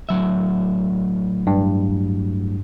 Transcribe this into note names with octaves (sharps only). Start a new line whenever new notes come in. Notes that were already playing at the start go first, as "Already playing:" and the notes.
A2 F#3 E5
G2